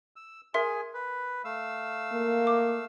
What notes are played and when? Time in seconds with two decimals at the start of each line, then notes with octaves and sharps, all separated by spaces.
0.16 E6
0.54 G#4 A#4 E5 G#5 C6
0.94 B4
1.45 A3 F5 E6
2.13 A#3
2.47 D6